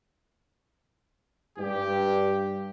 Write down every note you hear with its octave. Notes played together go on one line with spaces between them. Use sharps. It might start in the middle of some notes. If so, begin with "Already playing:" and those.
G2 G4